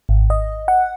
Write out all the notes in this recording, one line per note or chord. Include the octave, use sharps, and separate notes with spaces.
G#1
D#5
F#5